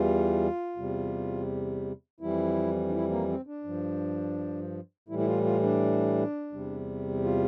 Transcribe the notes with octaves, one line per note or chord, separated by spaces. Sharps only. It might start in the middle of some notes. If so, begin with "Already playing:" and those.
Already playing: E2 E3 G3 F4
E2 C3 G3
F2 E3 G3 E4
D4
E4
A#3
C4
D4
G2 F3
A2 E3 G3 E4
E4
F4
F4
D4
E2 C3 G3
F4